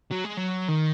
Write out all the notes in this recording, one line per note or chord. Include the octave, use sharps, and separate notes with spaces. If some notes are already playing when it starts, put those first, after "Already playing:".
F#3
G#3
F#3
D#3